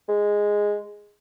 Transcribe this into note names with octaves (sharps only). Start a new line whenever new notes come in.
G#3